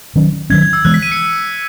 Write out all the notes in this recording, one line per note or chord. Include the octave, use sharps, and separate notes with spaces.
D#3 F#3 C#4
D#3 F#3 C#4 G#6
G#6
E6
E3 G#3 B3 F#6
B6
D#7
C#7